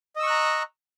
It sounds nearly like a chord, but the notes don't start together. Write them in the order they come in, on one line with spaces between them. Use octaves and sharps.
D#5 E6 C#6 F#6 A#5